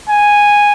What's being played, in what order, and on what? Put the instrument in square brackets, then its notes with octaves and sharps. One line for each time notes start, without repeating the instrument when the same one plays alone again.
[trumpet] G#5